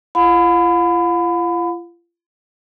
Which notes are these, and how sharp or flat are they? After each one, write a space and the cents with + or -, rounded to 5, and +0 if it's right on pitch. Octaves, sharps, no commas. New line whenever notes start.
F4 -40 F5 +45 B5 +25